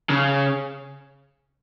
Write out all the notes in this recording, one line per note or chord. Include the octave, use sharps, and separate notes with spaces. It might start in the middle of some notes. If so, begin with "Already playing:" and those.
C#3